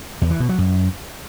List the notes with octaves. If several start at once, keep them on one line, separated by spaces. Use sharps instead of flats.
E2
E3
B2
F#3
F#2